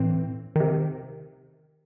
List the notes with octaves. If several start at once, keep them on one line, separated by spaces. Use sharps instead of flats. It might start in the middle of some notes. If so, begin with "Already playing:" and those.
Already playing: A2 E3 C4
C3 D#3